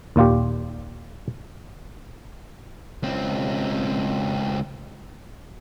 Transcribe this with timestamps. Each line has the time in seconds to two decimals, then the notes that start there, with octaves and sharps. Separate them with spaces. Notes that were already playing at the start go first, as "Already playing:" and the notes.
0.16 D#2 A#2 F4 G4
3.03 C#2 C4